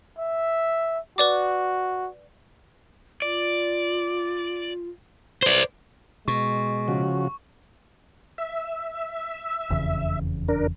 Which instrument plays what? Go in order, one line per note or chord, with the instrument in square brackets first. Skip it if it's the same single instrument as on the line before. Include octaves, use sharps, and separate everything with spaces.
[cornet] E5
[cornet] F#4 [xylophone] B4 D5 D6
[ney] F4 [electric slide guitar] D5
[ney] B4 [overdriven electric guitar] C5 D5
[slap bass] B2 [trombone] G#3 [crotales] C#6
[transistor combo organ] C#3 F3 F#4
[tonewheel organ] E5
[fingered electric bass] F1 E2 C#3
[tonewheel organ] D4 A#4